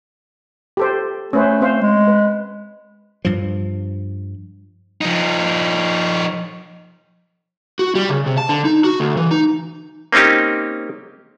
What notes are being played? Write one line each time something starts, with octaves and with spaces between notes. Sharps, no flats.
G4 A4 C5
A3 C#4 B4 C5
C4 C5 F5
G#3
B4
G2 F3
F3 D#4
F#4
G3
C#3
C3
A5
D3
D#4
F#4
D2
E3
D#4
A#3 C4 C#4 D#4 G4